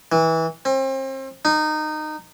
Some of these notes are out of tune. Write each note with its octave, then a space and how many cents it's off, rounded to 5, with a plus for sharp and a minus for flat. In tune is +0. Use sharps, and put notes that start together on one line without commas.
E3 -20
C4 +35
D#4 -20